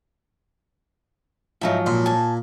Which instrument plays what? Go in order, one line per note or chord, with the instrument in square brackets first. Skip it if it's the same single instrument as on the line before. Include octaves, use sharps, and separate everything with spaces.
[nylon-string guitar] G#2 F3 F#3 [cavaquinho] D#4 A#4 E5
[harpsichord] A#2 [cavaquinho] C6
[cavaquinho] G#5 A5